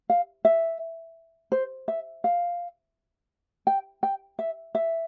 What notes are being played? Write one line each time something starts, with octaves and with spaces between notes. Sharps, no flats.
F5
E5
C5
E5
F5
G5
G5
E5
E5